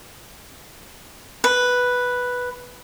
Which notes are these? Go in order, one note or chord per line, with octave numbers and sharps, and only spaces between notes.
B4